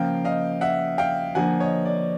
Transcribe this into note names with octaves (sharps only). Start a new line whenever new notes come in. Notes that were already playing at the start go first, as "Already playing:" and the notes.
Already playing: C#3 F3 A#3 F5 G5
D#5 F5
E5 F#5
F5 G5
D3 F3 A#3 F#5 G#5
C#5 D#5
D5